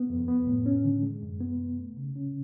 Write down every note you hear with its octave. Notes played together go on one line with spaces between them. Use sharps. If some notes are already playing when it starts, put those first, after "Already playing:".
Already playing: B3
F2
B3
A2
C#4
D3
G#3
F#2
B3
F#2
A3
C#3
C#4